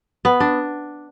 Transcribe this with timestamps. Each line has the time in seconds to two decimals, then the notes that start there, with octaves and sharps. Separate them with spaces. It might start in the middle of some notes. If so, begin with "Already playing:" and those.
0.25 B3
0.40 D4